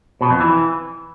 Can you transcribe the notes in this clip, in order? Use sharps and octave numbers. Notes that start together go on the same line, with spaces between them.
B2
F2
E3